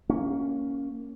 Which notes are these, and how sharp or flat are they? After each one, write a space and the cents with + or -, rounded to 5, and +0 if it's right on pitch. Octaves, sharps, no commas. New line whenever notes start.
A#3 +0 C#4 +5